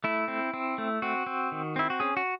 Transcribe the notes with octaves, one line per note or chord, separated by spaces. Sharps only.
A3 E4
C4
C4
A3
C4 F#4
C4
D#3
C4 E4
F#4
C#4 G#4
F#4